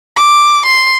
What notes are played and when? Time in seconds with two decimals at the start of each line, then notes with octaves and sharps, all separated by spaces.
0.16 D6
0.66 C6